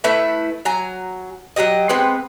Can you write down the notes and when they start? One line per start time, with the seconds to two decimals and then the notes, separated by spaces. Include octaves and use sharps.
0.04 A3 E4 B4 E5
0.65 F#3 G#5 A#5
1.56 F#3 G3 G4 D#5
1.89 G#3 B3 C4 B4